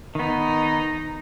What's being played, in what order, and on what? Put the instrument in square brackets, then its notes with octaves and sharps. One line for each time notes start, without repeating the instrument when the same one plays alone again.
[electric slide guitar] D#3 B3 [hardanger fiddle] D#4